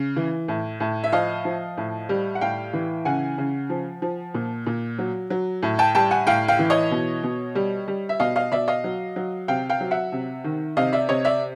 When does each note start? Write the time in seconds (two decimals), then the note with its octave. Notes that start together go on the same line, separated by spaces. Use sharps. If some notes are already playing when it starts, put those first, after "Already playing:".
Already playing: C#3
0.16 E3
0.48 A2
0.80 A2
1.04 E5
1.12 F3 D#5 F5
1.45 F3
1.77 A2
2.09 G3
2.35 F#5
2.41 A2 F5 G5
2.73 E3
3.05 C#3 F#5 G#5
3.38 C#3
3.70 F3
4.02 F3
4.34 A#2
4.66 A#2
4.99 F#3
5.30 F#3
5.63 A2
5.79 G5 A5
5.95 G3 G5 A5
6.11 F#5 G#5
6.27 A2 F5 G5
6.48 F5 G5
6.59 E3
6.70 C#5 D#5
6.91 B2
7.23 B2
7.55 G3
7.88 G3
8.09 E5
8.20 B2 D#5 F5
8.36 D#5 F5
8.52 B2 D5 E5
8.68 D#5 F5
8.84 F#3
9.16 F#3
9.48 C3 F5 G5
9.69 F5 G5
9.81 F#3
9.91 E5 F#5
10.12 C3
10.44 D#3
10.77 C3 D#5 F5
10.93 D5 E5
11.09 C3 C#5 D#5
11.25 D5 E5